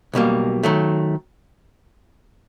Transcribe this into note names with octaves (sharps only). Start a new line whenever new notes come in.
B1 B2 G3 A#3
D#3 F#3 A3